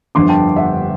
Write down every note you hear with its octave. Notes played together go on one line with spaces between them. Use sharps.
G1 F2 D3 C6 D6
G5 A5
E5 F#5